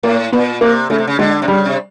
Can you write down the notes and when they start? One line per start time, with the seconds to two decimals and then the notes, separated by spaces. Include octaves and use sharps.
0.03 A2 A#3
0.32 A#2 B3
0.61 C3 A#3
0.90 C#3 A3
0.98 C3
1.07 C#3
1.19 D3 G#3
1.42 C3
1.48 C#3 G3
1.65 C3